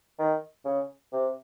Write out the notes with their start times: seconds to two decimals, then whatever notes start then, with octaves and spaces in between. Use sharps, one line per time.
0.19 D#3
0.65 C#3
1.13 C3